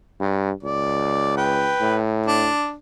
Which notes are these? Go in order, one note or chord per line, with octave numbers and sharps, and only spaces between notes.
G2
C#2 D5
B4 G5
A2
D4